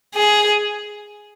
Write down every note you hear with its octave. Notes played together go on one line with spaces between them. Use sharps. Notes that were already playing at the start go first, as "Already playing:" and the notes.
G#4